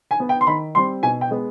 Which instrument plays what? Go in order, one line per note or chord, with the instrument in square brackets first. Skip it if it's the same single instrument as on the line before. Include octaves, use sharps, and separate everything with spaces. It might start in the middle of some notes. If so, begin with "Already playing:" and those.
[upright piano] G#5
B3
G5
C6
D#3 B5
G3 C4 C6
B2 G#5
G5
G#3 B3